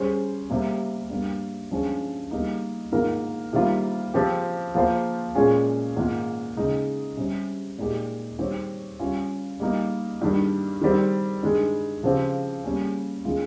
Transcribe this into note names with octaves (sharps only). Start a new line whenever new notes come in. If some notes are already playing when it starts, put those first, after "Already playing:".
Already playing: G3 C#4 G#4 C5
C3 G3 A#3
G2 G3 A#3
G2 F3 G#3 C#4
G3 A#3 D#4
G#2 D#3 A#3 F4 A#4
C3 D#3 G3 A#3 F4
F3 C4 G4
F3 A#3 F4 C5
A#2 G#3 C#4 F4 G#4
G#2 D#3 A#3 F4
C#3 G#3 D#4
C3 G3 C#4
A#2 G#3 D#4 G4
D#3 G3 C4 G4 C#5
G3 C#4 F4
G3 A#3 D#4
G2 D#3 G3
D#3 G3 C4
G2 D#3 G#3
C#3 F3 C4 G4
G3 A#3 C#4
D#3 G#3 C#4 F4